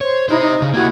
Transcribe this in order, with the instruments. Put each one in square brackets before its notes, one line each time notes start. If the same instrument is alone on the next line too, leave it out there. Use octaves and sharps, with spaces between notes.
[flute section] C5 [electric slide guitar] C#5
[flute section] D#4 E4 [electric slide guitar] G4 C5
[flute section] D#4
[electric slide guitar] C#3
[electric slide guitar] A#3 G4 [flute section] E4 F#4 G#6